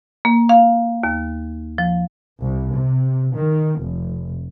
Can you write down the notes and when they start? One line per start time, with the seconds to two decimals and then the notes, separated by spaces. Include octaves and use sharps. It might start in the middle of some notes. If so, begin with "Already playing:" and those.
0.25 A#3
0.49 F5
1.04 D#2
1.78 F3
2.43 C2
2.76 C3
3.35 D#3
3.82 F1